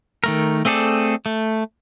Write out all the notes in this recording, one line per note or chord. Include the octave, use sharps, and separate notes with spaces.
D#3 A3 A#4
A3 C4 G#4 A4 D5
A3